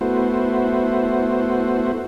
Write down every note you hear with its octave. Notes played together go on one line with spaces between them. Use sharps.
A3 B3 E4 F#4 C5